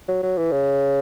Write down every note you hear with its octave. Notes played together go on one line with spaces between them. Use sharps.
F#3
F#3
E3
C#3